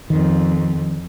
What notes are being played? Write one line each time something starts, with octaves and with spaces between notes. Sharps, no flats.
F2 D#3